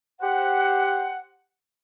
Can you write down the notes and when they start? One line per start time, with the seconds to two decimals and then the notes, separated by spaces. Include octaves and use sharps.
0.22 G4 C5 F#5